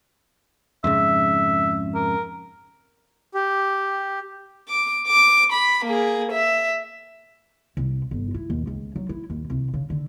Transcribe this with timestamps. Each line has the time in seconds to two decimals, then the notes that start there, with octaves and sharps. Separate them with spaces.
0.84 F2 G#2 C#3 E5
1.95 A#4
3.34 G4
4.68 D6
5.07 D6
5.53 B5
5.85 A#3 G#4
6.32 E5
7.77 C2
8.11 G1
8.34 E4
8.50 D#2
8.67 C#2
8.96 F#3
9.09 E4
9.30 D#2
9.50 C2
9.74 C#3
9.90 D3